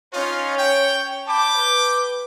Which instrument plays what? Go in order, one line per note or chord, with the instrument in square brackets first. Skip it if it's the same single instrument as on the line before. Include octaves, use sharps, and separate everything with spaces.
[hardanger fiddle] C#4 C#5 [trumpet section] D#4 F4
[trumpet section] G5
[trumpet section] G5 D6 [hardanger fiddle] A5 B5
[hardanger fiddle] B4